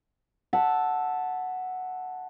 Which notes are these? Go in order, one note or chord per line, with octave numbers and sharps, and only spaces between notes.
E5 F#5 A5